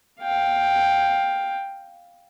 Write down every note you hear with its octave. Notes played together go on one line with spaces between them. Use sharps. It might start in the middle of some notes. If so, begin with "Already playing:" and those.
F5 G5